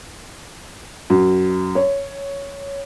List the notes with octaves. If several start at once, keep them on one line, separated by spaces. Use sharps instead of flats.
F#2
C#5